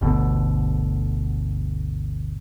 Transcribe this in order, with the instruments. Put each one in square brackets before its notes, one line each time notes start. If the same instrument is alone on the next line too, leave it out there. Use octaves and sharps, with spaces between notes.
[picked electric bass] G1 D2 B2 D3